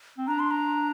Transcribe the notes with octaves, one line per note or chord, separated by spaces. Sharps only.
C4
D4 A#5
C6
A#5